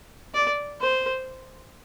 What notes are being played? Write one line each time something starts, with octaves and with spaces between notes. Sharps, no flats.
D5
C5